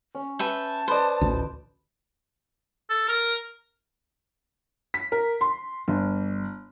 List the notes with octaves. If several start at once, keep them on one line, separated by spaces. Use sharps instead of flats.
C#4
B4 E5 G5 A5
B4 C5 D5 D#5
A1 D2
A4
A#4
B6
A#4
C6
G1